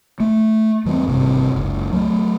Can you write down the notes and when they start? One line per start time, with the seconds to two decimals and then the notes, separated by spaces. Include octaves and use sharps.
0.20 A3
0.85 F2 E3 G3 C4
1.07 G#1 G2 C3
1.54 F#1 C#2
1.92 F#3 G#3 A3